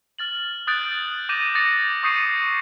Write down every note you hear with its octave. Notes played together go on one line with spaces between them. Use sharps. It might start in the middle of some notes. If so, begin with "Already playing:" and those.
F6 A6 F#7
D#6 F#6 G6 A6 D7
D6 G6 A#6 D#7 E7
D6 D#6 A6 A#6 C#7
C#6 D#6 G6 C7 C#7 D#7